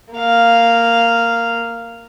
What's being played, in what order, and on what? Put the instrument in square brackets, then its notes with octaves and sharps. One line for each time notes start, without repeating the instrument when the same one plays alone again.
[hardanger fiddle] A#3 F5